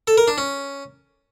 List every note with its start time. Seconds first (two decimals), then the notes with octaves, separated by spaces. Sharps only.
0.07 A4
0.18 A#4
0.28 D4
0.38 C#4